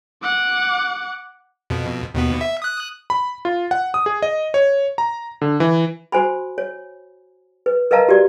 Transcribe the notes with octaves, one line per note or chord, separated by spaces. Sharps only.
F#5 D6
F2 B2
D#2 B2 B3
E5
D#6 F#6
B5
F4
F#5
D#6
G#4
D#5
C#5
A#5
D3
E3
F#4 C5 G#5 B5
C#5
B4
A#4 B4 D#5 F5 A5 A#5
F#4 G4 D5